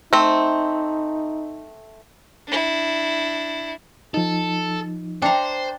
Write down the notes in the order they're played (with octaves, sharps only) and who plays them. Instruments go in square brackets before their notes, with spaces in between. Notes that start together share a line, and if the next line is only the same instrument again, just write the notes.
[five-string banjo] A3 C4 [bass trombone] D#4
[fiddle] D4 E4
[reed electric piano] F3 D#4 [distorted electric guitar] A4
[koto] D4 A#5 [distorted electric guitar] C5 [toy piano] E5 G5